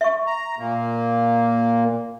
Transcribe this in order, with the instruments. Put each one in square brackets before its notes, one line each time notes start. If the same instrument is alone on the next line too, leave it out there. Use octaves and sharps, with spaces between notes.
[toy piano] E5 C#6
[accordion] A#5
A#2 A#3